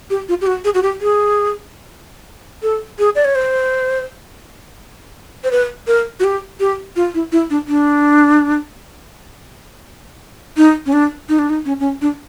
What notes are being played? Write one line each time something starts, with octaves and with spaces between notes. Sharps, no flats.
G4
F4
G4
F#4
G#4
F#4
G4
G#4
A4
G#4
D5
C#5
C5
C5
B4
A#4
F#4
G4
G4
F4
E4
E4
D4
D4
D#4
C#4
D4
D#4
D4
D#4
C#4
C#4
D4